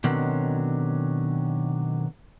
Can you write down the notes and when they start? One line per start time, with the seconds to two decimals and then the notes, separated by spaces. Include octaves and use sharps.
0.04 B2 D3 D#3 F#3 C4 C#4